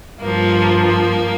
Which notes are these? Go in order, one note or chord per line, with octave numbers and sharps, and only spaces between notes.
G2 F3 A#3
A#3